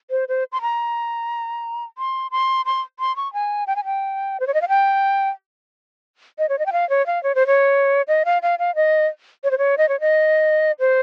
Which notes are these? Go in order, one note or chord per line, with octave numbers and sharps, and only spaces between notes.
C5
C5
C6
A#5
C6
C6
C6
C6
C#6
G#5
G5
G#5
G5
C5
C#5
D#5
F5
G5
D#5
C#5
D#5
G5
F5
C#5
F5
C#5
C5
C#5
D#5
F5
F5
F5
D#5
C#5
C5
C#5
D#5
C#5
D#5
C5